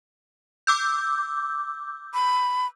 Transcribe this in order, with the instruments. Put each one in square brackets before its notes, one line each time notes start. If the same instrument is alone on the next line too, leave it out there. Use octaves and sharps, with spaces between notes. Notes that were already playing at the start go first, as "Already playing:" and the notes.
[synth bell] D6 E6 G6
[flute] B5